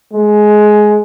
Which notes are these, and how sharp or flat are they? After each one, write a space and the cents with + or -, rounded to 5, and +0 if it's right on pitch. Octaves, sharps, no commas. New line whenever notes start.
G#3 +15